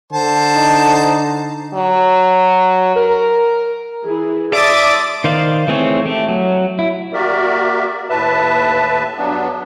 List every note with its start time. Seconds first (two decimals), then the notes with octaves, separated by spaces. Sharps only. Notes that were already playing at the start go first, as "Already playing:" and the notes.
0.12 D3 C5 A5
0.56 D#4
1.74 F#3
2.96 A#4
4.04 E3 E4 G#4
4.53 D5 E5 A5 C6 D6 D#6 A6
5.24 D#3 C5 D5 F5
5.68 E3 A3 C4 G#4 C#5
6.06 A3 G4
6.28 F#3
6.79 E4
7.13 A#3 F#4 G4 A#4 D5 E5
8.09 D#2 A2 B4 E5 A5
9.17 G2 F#3 B3 D4